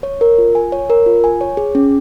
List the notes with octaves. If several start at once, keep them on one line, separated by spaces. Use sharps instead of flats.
C#5
A#4
F4
G#5
C#5
A#4
F4
G#5
C#5
G#4
C#4